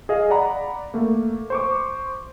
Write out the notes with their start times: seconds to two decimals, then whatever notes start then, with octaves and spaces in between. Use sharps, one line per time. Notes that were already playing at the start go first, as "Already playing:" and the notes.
0.09 G#4 D#5 F5
0.30 D5 F#5 A#5 B5
0.94 A3 A#3
1.50 C5 C#6 D6